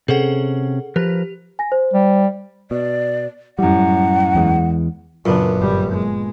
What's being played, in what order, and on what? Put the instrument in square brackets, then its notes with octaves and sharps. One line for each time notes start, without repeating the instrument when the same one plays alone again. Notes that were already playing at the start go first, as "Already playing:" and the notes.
[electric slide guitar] C3 C#4 [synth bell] G#4 A4 F#5
[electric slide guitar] F3 A#4 B4 [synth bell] G4
[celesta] G#5 A#6
C5
[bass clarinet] G3
[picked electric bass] B2 [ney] D5
[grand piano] F#2 A2 [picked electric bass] G3 [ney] F#5
[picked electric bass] E2 E3 G#3
[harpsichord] F#2 [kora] A#2 B3 D4 [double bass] C#3
[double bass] G1 G3
G#3